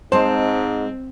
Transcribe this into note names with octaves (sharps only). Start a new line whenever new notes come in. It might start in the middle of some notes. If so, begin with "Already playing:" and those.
G#2 G#3 C4 C5 A5